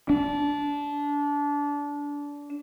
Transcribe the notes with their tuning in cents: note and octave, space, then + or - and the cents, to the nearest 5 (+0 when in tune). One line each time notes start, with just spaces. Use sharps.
D4 -20